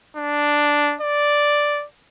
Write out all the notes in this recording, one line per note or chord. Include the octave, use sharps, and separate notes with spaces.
D4
D5